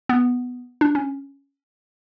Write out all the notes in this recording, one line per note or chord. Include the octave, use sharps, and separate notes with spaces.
B3
D4
C#4